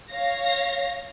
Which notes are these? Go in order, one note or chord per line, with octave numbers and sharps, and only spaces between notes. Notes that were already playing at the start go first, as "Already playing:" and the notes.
C#5 F5 A#6